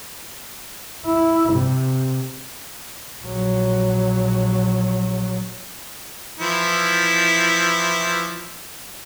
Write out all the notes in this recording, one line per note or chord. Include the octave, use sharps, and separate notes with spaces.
E4
C3
A#1 F#3
E3 F3 E4